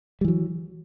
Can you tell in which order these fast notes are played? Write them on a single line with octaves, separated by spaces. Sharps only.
G3 E3 F#3